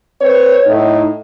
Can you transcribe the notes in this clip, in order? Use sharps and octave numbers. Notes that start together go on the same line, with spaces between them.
C4 B4 C#5
A2 D#4